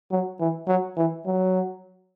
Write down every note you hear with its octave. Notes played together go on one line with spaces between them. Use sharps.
F#3
E3
F#3
E3
F#3